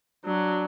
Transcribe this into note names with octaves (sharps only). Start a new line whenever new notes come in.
F#3 D4